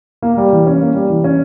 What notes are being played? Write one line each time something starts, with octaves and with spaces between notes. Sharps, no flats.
A#3
G3
E3
C#4
A#3
G3
E3
C#4